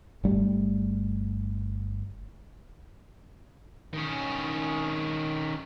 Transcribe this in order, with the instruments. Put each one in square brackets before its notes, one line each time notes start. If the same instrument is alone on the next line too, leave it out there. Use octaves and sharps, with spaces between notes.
[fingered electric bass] G1 G3 A3
[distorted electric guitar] D#3 C#4